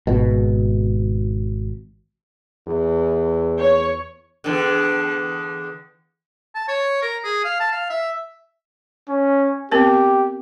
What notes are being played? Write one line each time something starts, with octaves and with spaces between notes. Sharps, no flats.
G#1 B2
E2
C#5
E2 D3
A5
C#5
A#4
G#4
F5
A5
F5
E5
C#4
B3 C4 G4 A#4